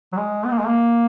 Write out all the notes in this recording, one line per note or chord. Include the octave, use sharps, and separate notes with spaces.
F#3
G#3
B3
A#3
G#3
A#3